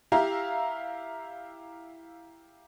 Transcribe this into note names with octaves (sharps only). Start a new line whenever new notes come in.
E4 G4 E5 F5 A#5